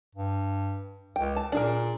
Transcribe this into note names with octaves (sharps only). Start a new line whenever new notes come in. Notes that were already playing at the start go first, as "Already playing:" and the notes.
G2
C#2 G5
A5
A#2 D4 G#4 A#4